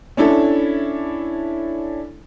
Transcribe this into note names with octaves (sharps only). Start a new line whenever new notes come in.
C#4 D4 E4 A4